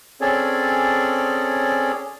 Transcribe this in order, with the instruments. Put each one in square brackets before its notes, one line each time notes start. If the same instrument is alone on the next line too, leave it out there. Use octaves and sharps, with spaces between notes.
[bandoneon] C4 C#4 G#4 A4 C#5 D5